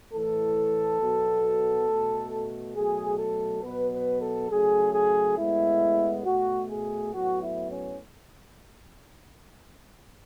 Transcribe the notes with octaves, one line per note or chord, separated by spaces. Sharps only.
A2 E3 A3 A4
B2 F#3 B3
B2 A3
B2 F#3 A3 G#4
A4
B2 F#3 B3 B4
B4
A4
C#3 F#3 A3 G#4
G#4
A2 G#3 B3 E4
B2 A3 F#4
G#4
A2 F#3 B3 F#4
E4
C#4